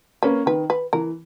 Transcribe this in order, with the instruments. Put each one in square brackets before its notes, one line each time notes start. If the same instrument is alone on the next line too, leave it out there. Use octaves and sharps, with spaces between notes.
[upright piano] A#3 C#4 [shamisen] B4
[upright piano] D#3 [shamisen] B4
[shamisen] B4
[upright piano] E3 [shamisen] A#4